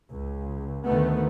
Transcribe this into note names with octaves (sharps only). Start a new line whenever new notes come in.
C#2
D2 D#3 A3 B3